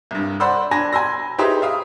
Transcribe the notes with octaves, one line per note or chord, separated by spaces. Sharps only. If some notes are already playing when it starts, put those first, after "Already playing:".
C2 G2
C5 D5 F#5 B5 C6 E6
D4 G#5 A#6
G#5 B5 C6 E6 A#6
D#4 G4 G#4 B4 C5 E5
E5 F5 D#6